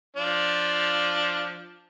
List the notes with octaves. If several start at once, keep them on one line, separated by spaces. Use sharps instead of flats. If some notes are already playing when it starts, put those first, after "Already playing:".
F3 D4 F4